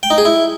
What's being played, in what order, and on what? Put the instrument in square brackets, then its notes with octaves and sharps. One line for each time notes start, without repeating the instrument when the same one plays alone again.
[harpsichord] G5
D#4
G#4
E4